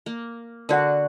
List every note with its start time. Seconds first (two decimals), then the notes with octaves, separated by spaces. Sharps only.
0.06 A#3
0.69 D3 F#4 A#4 D5 F#5